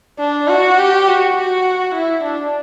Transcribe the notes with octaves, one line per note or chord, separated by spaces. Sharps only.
D4
F#4
G4
F#4
F#4
E4
D4